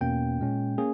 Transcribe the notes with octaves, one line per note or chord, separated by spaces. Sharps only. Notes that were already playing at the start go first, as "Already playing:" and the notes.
E2 B2 A#3 C#4 G5
A#2 G#3 C#4
A#3 C#4 G#4